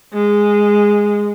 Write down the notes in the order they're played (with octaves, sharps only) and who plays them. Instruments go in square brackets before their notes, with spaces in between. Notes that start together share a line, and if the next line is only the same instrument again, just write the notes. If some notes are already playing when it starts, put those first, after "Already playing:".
[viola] G#3